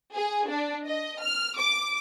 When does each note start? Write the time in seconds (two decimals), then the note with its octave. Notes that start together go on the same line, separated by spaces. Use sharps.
0.13 G#4
0.47 D4
0.86 D#5
1.20 F6
1.57 D6